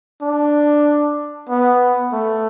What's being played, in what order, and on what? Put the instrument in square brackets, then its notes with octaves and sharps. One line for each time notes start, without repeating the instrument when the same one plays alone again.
[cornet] D4
B3
A3